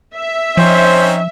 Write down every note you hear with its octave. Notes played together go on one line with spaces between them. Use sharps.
E5
F3 C4 C#4 D#4 C5